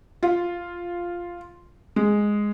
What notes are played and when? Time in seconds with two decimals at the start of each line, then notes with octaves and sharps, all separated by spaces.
0.23 F4
1.96 G#3